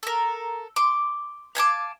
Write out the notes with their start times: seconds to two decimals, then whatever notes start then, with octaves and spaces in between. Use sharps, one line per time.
0.03 A4 A#4
0.76 C6 D6
1.55 F5 G#5 A5 D6